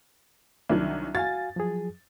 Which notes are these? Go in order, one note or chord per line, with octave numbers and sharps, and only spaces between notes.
C2 D#3 F#3 D4
F#4 F5 G#5 A6
F3 F#3 G#4